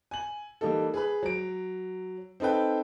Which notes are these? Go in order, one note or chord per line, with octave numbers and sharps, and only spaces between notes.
G#5 F#7
E3 G3 A#3 D#4 A4
G#4 B4 B5
F#3 D7
C4 D#4 A4 B4 G5